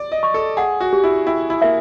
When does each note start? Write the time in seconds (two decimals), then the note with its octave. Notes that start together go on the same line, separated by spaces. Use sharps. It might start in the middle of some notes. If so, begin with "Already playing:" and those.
Already playing: D5
0.12 D#5
0.23 C#6
0.34 A4
0.57 G#4 F#5
0.80 F#4
0.93 G4
1.04 E4
1.27 E4 G5
1.50 E4
1.62 A#3 E5